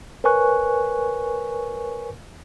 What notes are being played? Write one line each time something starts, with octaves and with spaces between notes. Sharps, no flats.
A#4 B4 C#5 G#5 C#6 F#6